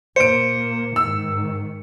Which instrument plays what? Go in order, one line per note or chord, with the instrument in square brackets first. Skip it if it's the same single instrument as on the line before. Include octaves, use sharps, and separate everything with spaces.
[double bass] A#2 A#3 [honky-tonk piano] C5 D7 [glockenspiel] C#7
[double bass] G#2 D#3 [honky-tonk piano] E6